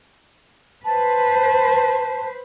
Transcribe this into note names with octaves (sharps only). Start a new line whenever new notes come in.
B4 C5 A5